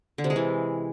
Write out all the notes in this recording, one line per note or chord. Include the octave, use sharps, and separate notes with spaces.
D3
C3
G#3
E3